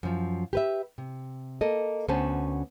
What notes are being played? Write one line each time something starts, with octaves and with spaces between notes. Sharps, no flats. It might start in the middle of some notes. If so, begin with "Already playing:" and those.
F#2 F3
G4 B4 E5
C3
A#3 A4 D#5
D2 B3 C#4 C5 A5